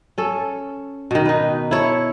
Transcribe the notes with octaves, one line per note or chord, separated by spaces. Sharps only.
C#4 A4
B2 D#3
D#4 B4
E4 A4 C#5